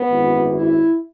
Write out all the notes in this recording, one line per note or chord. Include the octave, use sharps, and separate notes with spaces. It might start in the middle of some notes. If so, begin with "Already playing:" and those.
Already playing: B3
G#1 F#2 E3
E4